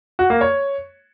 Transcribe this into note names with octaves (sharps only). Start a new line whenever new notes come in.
F#4
A#3
C#5